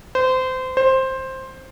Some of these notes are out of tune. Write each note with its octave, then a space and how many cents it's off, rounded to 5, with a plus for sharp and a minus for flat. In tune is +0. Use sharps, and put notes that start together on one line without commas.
C5 -25
C5 +10